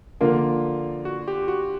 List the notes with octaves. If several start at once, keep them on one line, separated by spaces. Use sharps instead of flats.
D3 F3 A#3 F4
F#4
G4
F#4